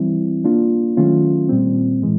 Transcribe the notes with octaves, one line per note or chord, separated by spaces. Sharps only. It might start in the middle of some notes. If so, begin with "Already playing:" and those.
Already playing: E3 G3 C4 E4
A#3 D4 F4
D#3 F#3 A3 C#4 F4
A#2 G3 C4
A2 E3 G#3